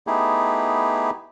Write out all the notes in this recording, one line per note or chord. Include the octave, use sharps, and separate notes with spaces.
A3 B3 D#4 E4 G4 G#4